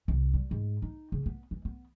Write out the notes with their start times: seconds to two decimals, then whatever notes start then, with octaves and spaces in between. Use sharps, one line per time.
0.08 C2
0.34 G3
0.51 G#2
0.82 D#4
1.12 C#3
1.26 B3
1.51 E3
1.65 B3